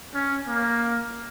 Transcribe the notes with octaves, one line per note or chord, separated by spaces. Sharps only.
C#4
A#3